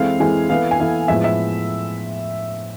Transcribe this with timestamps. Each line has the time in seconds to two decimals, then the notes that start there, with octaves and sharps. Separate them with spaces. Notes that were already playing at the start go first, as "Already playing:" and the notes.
Already playing: E3 G#3 C4 E4 A4 F5
0.19 E3 G#3 C4 E4 A4 G#5
0.50 E3 B3 E4 A4 F5
0.71 G#5
0.79 E3 B3 E4 A4 F5
1.08 A2 F3 G#3 B3 E4 E5
1.24 E5